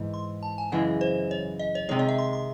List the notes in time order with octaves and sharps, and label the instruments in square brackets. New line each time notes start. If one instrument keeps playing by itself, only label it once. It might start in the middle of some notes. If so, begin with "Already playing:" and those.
Already playing: [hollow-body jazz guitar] G#2 E3
[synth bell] C6
A5
G#5
[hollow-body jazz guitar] F#2 C#3 E3 G#3 [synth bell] F#5
[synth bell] C5
C#5
D#5
C#5
[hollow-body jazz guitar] C3 D#3 G#3 [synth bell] C#5
[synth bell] D#5
E5
C6
C6